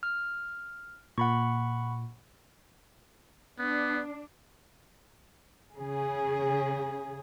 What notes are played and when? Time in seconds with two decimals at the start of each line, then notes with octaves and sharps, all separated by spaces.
0.03 F6
1.18 A#2 F#5 B5 C#6
3.59 B3 D4
5.75 C#3 G#4